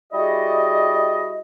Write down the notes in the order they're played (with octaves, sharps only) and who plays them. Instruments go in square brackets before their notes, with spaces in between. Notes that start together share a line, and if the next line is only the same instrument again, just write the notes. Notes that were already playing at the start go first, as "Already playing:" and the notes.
[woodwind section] G3 E4 F#4 G#4 D5 D#5